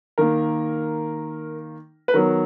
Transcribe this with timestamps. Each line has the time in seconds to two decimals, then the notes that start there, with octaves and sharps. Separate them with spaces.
0.18 D#3 A#3 A#4
2.08 B4
2.14 D#3 F#3 B3 A#4